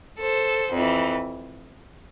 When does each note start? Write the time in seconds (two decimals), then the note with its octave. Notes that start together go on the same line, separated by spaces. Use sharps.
0.20 A4 C5
0.74 F2 E3